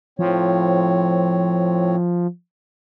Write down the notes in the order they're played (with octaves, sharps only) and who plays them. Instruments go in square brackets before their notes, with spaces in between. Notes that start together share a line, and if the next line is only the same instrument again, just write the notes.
[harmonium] A2 C4 C#5 [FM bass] F3